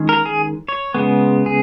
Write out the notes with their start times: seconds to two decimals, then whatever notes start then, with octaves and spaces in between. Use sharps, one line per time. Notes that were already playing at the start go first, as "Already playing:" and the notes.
Already playing: D#3 G#3 C#4
0.09 A#4
0.25 G#4
0.68 C#5
0.95 C#3 G#3 B3
1.46 G#4